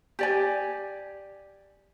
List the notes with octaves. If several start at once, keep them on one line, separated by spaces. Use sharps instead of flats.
G4 D5 G#5